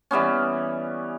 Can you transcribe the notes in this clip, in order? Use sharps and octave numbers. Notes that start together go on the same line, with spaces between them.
E3 G3 B3 C#4